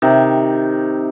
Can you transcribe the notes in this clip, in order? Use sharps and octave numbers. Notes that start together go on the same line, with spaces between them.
C3 D#3